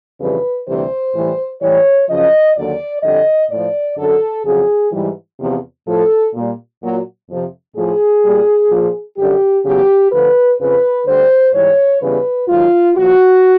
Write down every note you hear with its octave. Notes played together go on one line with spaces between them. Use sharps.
F2 C#3 E3 G3 B4
D2 C3 E3 G3 C5
A2 E3 G3
A2 E3 G3 C#5
F#2 C#3 F3 D#5
D#2 D3 F#3 D5
F2 D3 G3 D#5
A2 F3 D5
F#2 D3 F#3 A4
F2 C#3 F#3 G#4
G#2 E3 G3
E2 C3 F3
A2 F3 A4
A#2 G3
A#2 F#3
F2 C3 F3
A2 F3 G#4
A#2 G3
A#2 F3
F#2 D3 G3 G4
E2 C#3 F#3 G4
D2 D3 F3 B4
F2 C#3 F3 B4
D2 D3 G3 C5
G#2 E3 G3 C#5
E2 C#3 E3 G3 B4
G#2 D#3 F#3 F4
A#2 F3 F#4